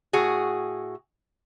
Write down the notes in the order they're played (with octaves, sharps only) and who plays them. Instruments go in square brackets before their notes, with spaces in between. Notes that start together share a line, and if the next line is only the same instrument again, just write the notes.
[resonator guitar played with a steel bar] A2 F#4 G#4